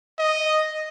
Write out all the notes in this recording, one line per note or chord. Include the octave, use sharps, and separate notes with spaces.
D#5